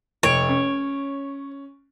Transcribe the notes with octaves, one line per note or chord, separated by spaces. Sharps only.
F1 C#5 D7
C#4